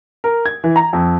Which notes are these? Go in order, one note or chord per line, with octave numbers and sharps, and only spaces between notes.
A#4
G#6
E3
A#5
F2